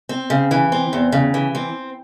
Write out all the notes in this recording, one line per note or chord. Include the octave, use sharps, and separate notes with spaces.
C4
C#3
E3
C4
E2
C#3
E3
C4